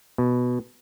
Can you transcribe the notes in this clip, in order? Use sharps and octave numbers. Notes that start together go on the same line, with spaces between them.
B2